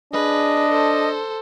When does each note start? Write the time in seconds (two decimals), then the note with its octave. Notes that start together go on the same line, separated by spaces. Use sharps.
0.13 D4 G#4 B4 D#5
0.70 A4 C5